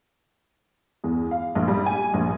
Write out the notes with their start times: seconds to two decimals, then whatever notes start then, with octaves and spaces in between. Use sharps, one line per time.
1.04 E2
1.31 F5
1.55 A#1
1.68 G3
1.86 G#5
2.14 A#1